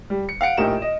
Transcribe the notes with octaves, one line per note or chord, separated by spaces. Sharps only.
G3
C#7
F5 F#5 C#7 D7
A#1 A2 D#4 G4 A#4 E7
D#5